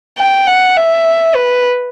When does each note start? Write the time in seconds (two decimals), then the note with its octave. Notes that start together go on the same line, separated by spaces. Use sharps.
0.19 G5
0.47 F#5
0.76 E5
1.35 B4